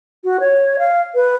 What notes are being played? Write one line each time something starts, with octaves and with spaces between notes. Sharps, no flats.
F#4
C#5
F5
B4